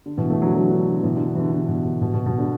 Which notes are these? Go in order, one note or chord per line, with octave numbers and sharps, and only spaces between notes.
D3
B2 E3
E3 A3
D3 F#3
D3 F#3
D3
D3
B2 E3
D3
D3
E3
D3
D3
B2
D3
B2
B2
B2
D3